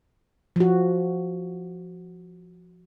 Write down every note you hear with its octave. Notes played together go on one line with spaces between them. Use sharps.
F3 F#4